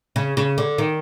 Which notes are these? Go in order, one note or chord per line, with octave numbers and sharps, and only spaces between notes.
C#3
C#3
D3
D#3